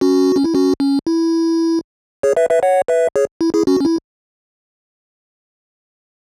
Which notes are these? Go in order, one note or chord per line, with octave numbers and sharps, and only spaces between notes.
C#4 F#4
C#4
E4
C#4 F#4
C#4
E4
G#4 C#5
B4 E5
B4 E5
C#5 F#5
B4 E5
G#4 C#5
E4
E4 G#4
C#4 F#4
C#4
E4